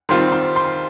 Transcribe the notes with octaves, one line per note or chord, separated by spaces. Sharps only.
D#3 G3 C4 F4 C6
C6
C6